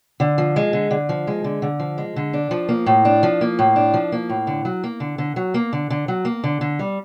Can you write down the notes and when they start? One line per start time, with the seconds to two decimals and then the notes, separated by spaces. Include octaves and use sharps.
0.20 D3
0.38 F3
0.56 G#3
0.73 D3
0.91 D3
1.09 F3
1.27 G#3
1.44 D3
1.62 D3
1.80 F3
1.98 G#3
2.16 D3
2.33 D4
2.51 F3
2.69 A#3
2.86 A2
3.05 D4
3.23 F3
3.41 A#3
3.59 A2
3.76 D4
3.94 F3
4.12 A#3
4.29 A2
4.47 D3
4.65 F#3
4.84 A#3
5.00 D3
5.18 D3
5.36 F#3
5.54 A#3
5.73 D3
5.90 D3
6.08 F#3
6.25 A#3
6.44 D3
6.61 D3
6.79 G3